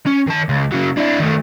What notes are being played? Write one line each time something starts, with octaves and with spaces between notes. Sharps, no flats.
C#4
D#3 A5
C#2
C#3 F#3
D4 E4
D#3 A3